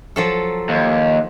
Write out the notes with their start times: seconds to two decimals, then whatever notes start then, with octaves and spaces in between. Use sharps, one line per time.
0.16 F3 F#3 A4
0.69 D#2